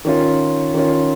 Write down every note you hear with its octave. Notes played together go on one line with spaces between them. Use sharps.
D#3 C#4 F4
D#3 C#4 F4